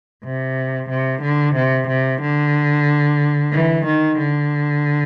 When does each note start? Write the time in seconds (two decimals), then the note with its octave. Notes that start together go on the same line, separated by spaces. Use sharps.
0.24 C3
0.90 C3
1.22 D3
1.55 C3
1.88 C3
2.21 D3
3.52 E3
3.86 D#3
4.18 D3